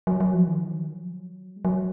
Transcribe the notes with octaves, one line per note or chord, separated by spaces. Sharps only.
F#3
F#3
F3
D#3
F3
D#3
F#3
F3
F#3
G#3
F#3